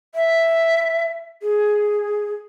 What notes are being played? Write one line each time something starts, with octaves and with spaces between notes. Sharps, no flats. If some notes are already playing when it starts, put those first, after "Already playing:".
E5
G#4